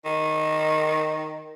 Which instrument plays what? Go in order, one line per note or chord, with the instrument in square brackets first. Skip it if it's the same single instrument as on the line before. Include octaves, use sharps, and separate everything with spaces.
[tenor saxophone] D#3